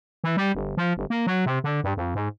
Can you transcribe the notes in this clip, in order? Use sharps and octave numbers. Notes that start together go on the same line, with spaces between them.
E3
G3
G1
F3
G1
A#3
F#3
C3
D3
G2
F2
G#2